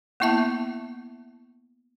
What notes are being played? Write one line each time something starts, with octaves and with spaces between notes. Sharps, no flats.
A#3 B3 E4 E5 A5 C#6